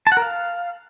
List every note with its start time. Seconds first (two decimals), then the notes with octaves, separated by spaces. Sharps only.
0.07 A5
0.12 F#5
0.17 A#4
0.22 F5